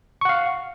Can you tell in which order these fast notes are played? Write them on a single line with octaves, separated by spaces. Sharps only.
C#6 F#5 F5